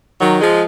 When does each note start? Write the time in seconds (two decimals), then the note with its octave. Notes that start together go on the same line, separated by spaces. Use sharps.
0.19 D#3 F#3
0.40 F3 G#3